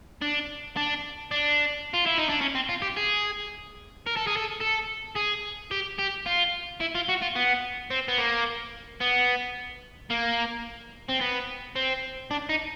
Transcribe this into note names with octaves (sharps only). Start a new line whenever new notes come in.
D4
D4
D4
F4
E4
D#4
D4
C#4
C4
F4
G4
G#4
A#4
A4
G#4
A4
A4
G#4
G4
G4
F4
E4
F4
F#4
F4
B3
C4
B3
A#3
B3
A#3
C4
B3
C4
D4
D#4